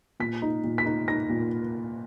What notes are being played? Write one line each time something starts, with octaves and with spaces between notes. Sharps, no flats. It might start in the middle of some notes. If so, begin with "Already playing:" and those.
A#2 B6
D#4
A#2
B6
D#4
D#4 A#6
A#2